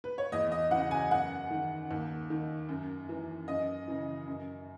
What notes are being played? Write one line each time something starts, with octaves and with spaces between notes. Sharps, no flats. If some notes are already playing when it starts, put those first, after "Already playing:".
B4
C#5
E2 D#5
D#5
C#3 E3 F#5
G#5
F#2 F#5
D#3
D#2
D#3
F#2
E3
F#2 D#5
C#3 E3
F#2